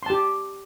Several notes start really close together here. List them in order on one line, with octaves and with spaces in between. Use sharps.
C6 A5 G4